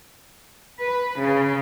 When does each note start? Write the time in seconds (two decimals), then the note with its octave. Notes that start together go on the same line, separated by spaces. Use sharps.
0.81 B4
1.20 C#3